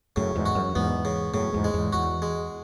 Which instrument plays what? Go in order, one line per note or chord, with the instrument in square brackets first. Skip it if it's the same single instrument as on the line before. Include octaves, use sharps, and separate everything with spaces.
[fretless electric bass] F#2 A2 [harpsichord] C#3
[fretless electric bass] E2 G#2
[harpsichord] F#4
[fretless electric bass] F#2
[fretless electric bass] E2 G#2 [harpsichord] B3
[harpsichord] C#3
[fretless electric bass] F#2 A2 [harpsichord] C#3
[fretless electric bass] E2 G#2
[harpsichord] G#3
[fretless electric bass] E2 G#2
[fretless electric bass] E2 [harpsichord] F#4
[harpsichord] G#3